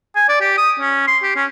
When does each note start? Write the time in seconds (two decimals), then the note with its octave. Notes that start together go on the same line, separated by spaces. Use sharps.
0.16 G#5
0.29 D5
0.41 G4
0.58 D#6
0.79 C#4
1.07 C6
1.23 G4
1.36 C#4